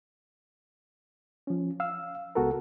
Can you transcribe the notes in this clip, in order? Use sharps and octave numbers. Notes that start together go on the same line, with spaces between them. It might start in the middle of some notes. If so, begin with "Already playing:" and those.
F3 C#4
F5 E6
C#2 B3 F#4 A4 A#4